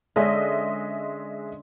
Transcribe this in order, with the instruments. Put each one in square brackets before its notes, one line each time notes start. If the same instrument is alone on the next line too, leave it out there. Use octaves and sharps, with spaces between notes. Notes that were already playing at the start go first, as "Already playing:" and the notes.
[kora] D3 C#4 [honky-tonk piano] G#3 D#5 E5